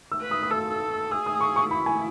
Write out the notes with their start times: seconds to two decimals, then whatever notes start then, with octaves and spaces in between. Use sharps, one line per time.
0.12 E6
0.22 B4
0.31 D#6
0.43 D#6
0.51 A4 E6
1.11 G#4 E6
1.26 D#6
1.41 C#6
1.56 C#6
1.70 E4 B5
1.86 G#5